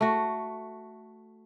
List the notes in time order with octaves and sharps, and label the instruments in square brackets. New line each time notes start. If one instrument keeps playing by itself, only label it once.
[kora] A3 F#4